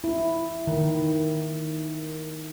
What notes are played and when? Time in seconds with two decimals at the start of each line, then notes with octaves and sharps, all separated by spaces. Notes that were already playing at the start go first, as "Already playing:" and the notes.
0.04 E4
0.67 D#3